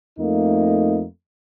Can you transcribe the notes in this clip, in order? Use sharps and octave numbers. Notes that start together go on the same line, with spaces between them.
F2 A3 A#3 D#4